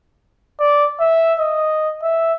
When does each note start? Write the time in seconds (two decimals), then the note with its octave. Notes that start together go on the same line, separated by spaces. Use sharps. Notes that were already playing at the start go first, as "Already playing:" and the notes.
0.59 D5
1.00 E5
1.39 D#5
2.02 E5